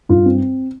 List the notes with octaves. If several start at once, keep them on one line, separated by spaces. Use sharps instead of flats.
G2 F4
C4